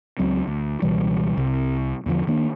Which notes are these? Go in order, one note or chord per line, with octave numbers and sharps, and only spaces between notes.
C#2 F#3 C4
D2
C#2 B2 E3 G3
C2 C3
E2 D3 F3
D#3 A#3 D4